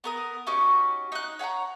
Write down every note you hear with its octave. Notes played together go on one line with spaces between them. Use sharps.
B3 A#4 D#6
C#4 D#4 F#4 G4
D#4 F#6
C#5 F#5 G#5 A#5